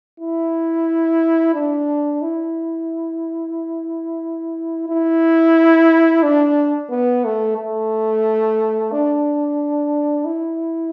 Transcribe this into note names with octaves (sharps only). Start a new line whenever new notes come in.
E4
D4
E4
E4
D4
B3
A3
A3
D4
E4